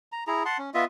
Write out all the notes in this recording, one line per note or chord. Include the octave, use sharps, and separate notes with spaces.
A#5
E4 G#4 A#5
F#5 A5 C6
C#4
B3 F4 D#5 E5